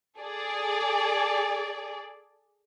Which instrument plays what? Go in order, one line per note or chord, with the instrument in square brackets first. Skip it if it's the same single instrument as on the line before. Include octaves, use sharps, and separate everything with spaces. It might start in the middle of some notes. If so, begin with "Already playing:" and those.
[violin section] G#4 A4 D5